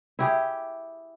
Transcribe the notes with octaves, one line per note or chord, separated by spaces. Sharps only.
E4 G4 G#4